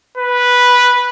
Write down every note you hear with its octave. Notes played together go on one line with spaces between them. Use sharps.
B4